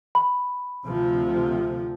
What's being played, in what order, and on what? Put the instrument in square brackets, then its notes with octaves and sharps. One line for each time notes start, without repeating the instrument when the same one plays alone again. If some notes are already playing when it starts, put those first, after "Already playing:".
[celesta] B5
[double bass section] D2 C3 F3